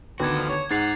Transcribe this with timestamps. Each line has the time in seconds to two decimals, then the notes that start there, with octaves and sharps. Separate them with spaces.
0.20 D2 D#3 B3 F#4 A4 D6 G#6
0.35 F3
0.49 C#5
0.71 G#2 D#4 F#5 A6 C7 F7